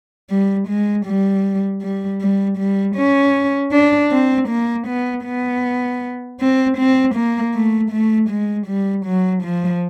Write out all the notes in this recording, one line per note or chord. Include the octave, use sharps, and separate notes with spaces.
G3
G#3
G3
G3
G3
G3
C#4
D4
C4
A#3
B3
B3
C4
C4
A#3
A3
A3
G#3
G3
F#3
F3